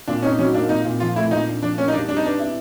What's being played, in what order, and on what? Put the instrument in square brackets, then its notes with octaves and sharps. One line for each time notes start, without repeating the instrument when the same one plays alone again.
[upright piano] A#2 [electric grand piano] D4
[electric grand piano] C#4 [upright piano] D#4
[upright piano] F#3 [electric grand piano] C#4
[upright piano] A#3 [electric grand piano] D4
[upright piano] A#2 [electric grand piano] D#4
[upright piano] A#2
[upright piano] F3 [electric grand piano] F4
[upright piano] A3 [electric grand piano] E4
[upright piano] A#2 [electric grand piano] D#4
[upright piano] D4
[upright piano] F3 [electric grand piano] D4
[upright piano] A#3 [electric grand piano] C#4
[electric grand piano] D#4
[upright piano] G3 [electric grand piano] D4
[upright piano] G3 [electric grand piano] D4
[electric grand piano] D#4
[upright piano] B3 [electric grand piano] D4
[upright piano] E4